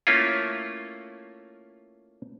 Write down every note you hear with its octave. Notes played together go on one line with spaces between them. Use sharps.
A3 A#3 C#4 E4 F4